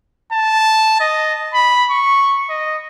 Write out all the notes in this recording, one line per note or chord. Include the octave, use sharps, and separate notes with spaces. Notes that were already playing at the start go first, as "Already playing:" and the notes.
A5
D#5
B5
C#6
D#5